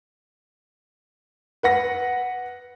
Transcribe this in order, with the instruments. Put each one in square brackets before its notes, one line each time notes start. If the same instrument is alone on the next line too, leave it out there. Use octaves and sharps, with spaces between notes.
[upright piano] B4 F#5 A#6